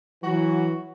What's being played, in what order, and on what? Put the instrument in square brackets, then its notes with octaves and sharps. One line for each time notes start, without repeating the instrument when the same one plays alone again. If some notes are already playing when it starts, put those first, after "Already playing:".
[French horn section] E3 F#3 [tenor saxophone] F#4